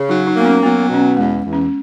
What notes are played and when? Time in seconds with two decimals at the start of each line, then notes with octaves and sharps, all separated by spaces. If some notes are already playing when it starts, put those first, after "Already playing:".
Already playing: C#3
0.09 F#3 D#4
0.27 D#4
0.36 A#3 B3
0.45 C#4
0.63 F#3 B3
0.81 B3
0.89 B2 C#4
0.99 B3
1.17 E2 G#3
1.44 E2
1.53 C#4